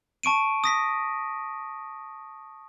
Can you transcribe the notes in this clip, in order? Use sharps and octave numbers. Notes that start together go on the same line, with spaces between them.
A5 C#6 D7 D#7
D#6 A#6 B6